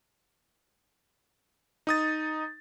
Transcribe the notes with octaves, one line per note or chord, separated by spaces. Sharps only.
D#4 D#6 A6